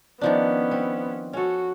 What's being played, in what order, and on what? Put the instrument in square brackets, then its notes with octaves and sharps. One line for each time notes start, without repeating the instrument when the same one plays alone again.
[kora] D#3 F3 D4 [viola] B3 C#4
[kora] C4
[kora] C#4 A4 [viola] F#4